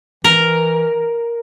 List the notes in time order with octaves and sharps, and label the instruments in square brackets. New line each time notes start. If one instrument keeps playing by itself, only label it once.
[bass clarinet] E3 [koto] A#4